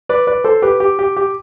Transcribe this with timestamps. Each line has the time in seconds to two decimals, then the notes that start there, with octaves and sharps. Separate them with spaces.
0.09 B4 D5
0.27 B4 D5
0.44 A4 C5
0.62 G4 B4
0.80 G4
0.99 G4
1.17 G4